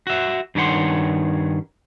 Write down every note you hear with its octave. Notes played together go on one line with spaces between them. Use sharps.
F#4 E5
G2 D#3 C#4 F#5 C6